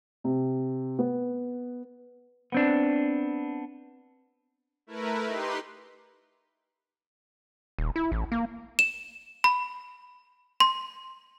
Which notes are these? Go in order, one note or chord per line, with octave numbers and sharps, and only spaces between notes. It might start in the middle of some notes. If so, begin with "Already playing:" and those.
C3
B3
B3 C4 D4
A3 E4 A#4 B4
D#4 G4 B4 C6
D#1
E4
A1
A#3
E7
B5
C6